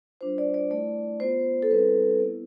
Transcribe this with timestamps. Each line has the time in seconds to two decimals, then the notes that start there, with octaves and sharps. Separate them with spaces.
0.21 G3 D4 F4 C5
0.38 D5
0.54 D5
0.71 A3 E4 D5
1.20 B3 F4 C5
1.62 A4
1.71 G3 C4 E4 B4
2.20 B3 E4